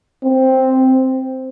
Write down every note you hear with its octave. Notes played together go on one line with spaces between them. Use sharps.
C4